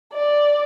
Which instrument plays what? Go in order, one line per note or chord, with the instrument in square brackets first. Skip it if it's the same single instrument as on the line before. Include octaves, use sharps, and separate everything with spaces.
[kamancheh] D5